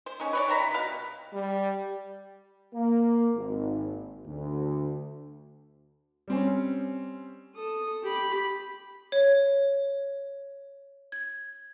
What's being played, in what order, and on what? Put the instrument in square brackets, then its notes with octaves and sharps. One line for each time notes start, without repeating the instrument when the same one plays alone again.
[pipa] C5
C#4 D#4
B4 C#5 D5
D#3 C5 A#5 B5
C3 B5
B2 F5
[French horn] G3
[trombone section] A#3
G#1
D2
[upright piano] G3 C4 C#4
[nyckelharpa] A4 D#6
G4 B5
[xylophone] C#5
G#6